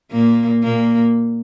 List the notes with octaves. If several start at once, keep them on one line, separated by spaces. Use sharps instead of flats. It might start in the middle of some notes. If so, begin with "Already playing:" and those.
A#2 A#3
A#2 A#3